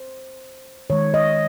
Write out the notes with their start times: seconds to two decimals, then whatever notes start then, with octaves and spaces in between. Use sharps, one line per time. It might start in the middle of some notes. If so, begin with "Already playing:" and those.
Already playing: C5
0.90 D#3 G#3 C#5
1.14 D#5